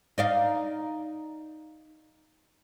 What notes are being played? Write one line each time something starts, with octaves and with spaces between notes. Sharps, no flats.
D#4 D5 F5